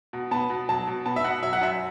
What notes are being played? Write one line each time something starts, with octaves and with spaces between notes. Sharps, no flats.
B2
B3 A5
B2
F#3 A5
B2
B3 A5
E5
B2 F#5
F#3 E5
F#5
F#2 E5